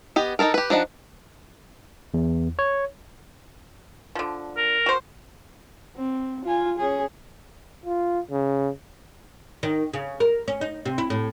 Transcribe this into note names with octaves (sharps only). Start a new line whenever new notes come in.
B3 G4 D#5
D#4 E4 A4 A#4
G4 B4
F3 D4 D#4 F#5
E2
C#5
D3 F3
A#4
F#4 C5
C4
F4 G#5
C#4 G#4
F4
C#3
D#3
C#3
A#4
C#4
D#4
C3
E4
A2